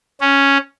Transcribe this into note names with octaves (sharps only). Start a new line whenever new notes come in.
C#4